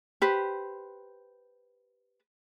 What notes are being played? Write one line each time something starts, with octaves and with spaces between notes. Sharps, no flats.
G4 B4 C5